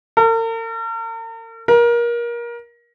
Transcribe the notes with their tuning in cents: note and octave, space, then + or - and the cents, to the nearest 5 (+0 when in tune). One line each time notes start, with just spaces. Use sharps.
A#4 -45
A#4 +25